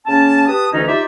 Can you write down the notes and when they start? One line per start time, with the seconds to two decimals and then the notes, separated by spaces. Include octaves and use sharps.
0.06 C#3 A#3 C#4 A5
0.47 G4 B4 A5 D#6
0.72 D2 D3 E3 C#4 D#4
0.88 D#4 F4 G4 C5 D5 E5